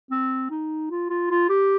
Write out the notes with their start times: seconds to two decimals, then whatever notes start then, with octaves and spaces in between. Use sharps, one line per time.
0.11 C4
0.51 D#4
0.90 F4
1.10 F4
1.31 F4
1.50 G4